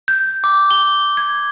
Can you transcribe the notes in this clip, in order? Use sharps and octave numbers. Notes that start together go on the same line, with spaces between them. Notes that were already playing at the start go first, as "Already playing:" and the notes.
G6
D6
G7
G#6